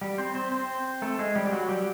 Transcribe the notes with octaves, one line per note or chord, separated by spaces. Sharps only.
G3 G4
C4 C5
C4 C5
C4 C5
A3 A4
G#3 G#4
G3 G4
G4
F#3 F#4
G3 G4